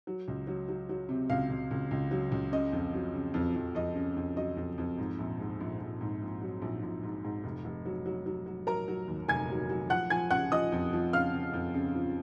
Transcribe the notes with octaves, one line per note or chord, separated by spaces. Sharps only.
F#3
C#2
F#3
F#3
F#3
C3
C#2 F5
C#2
C#2
C#2
F#3
C#2
C#3 D#5
F2
F#3
C#3
F2
F2
F2 D#5
C#3
F2
F#3 D#5
F2
F2
G#2
A#1
G#2
A#1
A#1
G#2
A#1
F#3
A#1
A#1
G#2
G#2
F1
F1
F#3
F#3
F#3
F#3
F#3 A#4 A#5
F#3
D#2
F1 G#5 G#6
F#3
F#3
F3 F#5 F#6
F3 G#5 G#6
C#3 F#5 F#6
F3 D#5 D#6
F2
F3
C#3 F5 F6
C#3
F2
C#3
F3